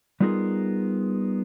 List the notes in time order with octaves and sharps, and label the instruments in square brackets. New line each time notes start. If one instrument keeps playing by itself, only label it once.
[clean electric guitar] G3 B3 D#4 F4 G#4 A#4